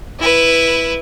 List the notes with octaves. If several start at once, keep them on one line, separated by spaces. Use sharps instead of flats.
E4 B4